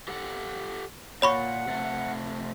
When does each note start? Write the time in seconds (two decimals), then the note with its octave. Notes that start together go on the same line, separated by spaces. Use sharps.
0.08 G4 A4 F#5
1.22 A#2 C#5 F#5 B5 C#6
1.67 C3 A3